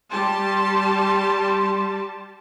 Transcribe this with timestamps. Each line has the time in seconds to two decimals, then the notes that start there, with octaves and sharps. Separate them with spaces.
0.12 G3 G4 A5 C6